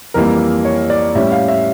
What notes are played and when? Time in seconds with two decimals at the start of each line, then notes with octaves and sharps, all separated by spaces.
0.14 F2 E3 G3 A#3 A#4
0.65 C#5
0.90 D5
1.15 A2 G3 C#4 E5
1.32 F5
1.48 E5